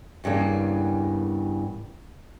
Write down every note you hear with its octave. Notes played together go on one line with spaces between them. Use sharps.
E2 G2 C#3 A#3